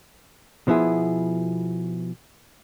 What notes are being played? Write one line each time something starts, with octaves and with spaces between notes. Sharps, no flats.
B2 F3 B3 E4 G#4